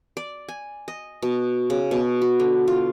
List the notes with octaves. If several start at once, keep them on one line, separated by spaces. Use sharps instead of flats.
D5
G#5
D#5
B2
C#3
B2
F#4
D3
F4